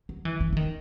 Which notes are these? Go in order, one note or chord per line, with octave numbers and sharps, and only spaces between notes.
F#3
E3
E3
E3
D#3